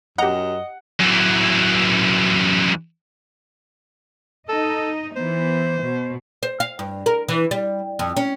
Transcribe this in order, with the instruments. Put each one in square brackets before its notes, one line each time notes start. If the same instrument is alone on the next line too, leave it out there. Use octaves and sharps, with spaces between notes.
[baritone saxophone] F#2 [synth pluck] G4 A#5 [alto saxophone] D#5 [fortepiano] F#5
[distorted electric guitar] F#2 E3
[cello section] D#4 D#5 [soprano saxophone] A4
[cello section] E3 B3 [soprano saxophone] C5
[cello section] B2
[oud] C5
F5
G2
A#4
E3
G3
F2
C#4